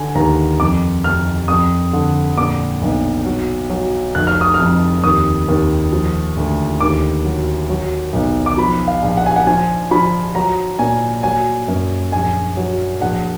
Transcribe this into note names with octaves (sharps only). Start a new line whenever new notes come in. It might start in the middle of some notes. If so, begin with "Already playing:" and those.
Already playing: D3 G#5
D#2 A#5
F2 D6
F2 F6
F2 D#6
D3
A#2 D6
B1
F#3
F#3
F1 F#6
F6
D#6
F6
F2
D#2 D#6
D#2
F3
D2
D#2 D6
F#3
F#3
B1
D6
F3 B5
F5
A#1
F#5
G#5
F#5
F3 G#5
F3 B5
F#3 A#5
A#2 G#5
F#3 G#5
F#2
A#1 G#5
F#3
A#1 F#5